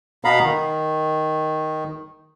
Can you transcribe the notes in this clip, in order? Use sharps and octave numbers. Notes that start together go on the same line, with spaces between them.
B2 B3 F5 A#5 B5
D#3